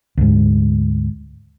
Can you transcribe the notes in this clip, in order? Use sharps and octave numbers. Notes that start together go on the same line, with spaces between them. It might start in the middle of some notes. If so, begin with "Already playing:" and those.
D2 G#2